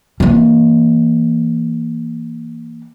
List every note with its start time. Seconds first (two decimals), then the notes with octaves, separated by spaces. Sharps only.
0.20 E3 A#3